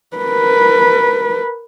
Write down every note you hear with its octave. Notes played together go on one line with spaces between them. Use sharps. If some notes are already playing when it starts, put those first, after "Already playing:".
A#4 B4